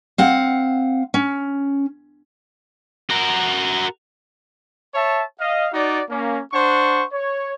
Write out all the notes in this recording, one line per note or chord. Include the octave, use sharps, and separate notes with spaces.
C4 F5 F#5
C#4
F#4 A#4
C#5 E5 A5
D#5 F5
D#4 F#4 D5
A#3 C#4
D4 C5 F#5 C#6
C#5